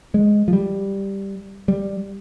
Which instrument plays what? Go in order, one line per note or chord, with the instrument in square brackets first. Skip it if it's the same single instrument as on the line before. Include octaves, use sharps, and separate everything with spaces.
[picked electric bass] G#3
F3
G3
G3